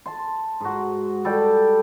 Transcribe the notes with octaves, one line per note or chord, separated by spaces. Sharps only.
A5 C6
G#2 F#4
G3 A4 D5 G5